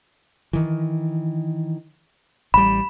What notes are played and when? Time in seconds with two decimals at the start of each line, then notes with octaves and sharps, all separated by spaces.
0.53 D#3 E3
2.54 A1 G3 B5